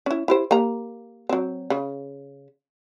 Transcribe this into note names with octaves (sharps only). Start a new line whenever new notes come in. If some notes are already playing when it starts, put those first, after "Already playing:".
C#4 E4
E4 G4 C5
A#3 G4 A#5
F#3 C4
C#3